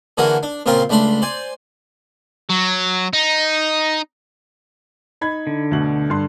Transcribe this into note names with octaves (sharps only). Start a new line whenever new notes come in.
D3 E3 A#3 F#4 G#4 A#4
D4
A#2 C#3 C4 F4 A#4 C6
C#2 A3 D4 B5 C6
C5 D5 G#5
F#3
D#4
D#4 B5 G#6
D3
D2 B2 F#7
G2 C6